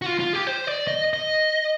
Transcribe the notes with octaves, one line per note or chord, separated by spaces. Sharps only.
F#4
F4
F4
G4
C5
D5
D#5
D#5